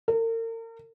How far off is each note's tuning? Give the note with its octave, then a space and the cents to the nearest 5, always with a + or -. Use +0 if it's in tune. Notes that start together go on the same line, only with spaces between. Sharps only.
A#4 -40